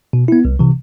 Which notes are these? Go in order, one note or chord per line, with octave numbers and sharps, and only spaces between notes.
B2
B3 E4
C2
C3 E3